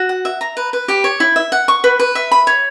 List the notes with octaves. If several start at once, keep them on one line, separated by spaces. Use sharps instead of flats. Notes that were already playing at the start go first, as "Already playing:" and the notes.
Already playing: F#4
F#5
E5
A#5
B4
B4
G4
C#5
E4
E5
F#5
C#6
B4
B4
E5
B5
C#5